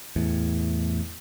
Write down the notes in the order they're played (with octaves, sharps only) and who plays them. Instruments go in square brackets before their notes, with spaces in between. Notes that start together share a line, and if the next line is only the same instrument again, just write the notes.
[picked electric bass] E2 A2